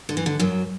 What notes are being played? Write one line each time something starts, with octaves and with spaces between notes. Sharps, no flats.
D3
E3
D3
F#2 F#3